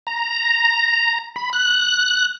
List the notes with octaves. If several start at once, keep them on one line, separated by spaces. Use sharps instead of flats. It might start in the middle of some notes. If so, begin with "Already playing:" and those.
A#5
B5
F#6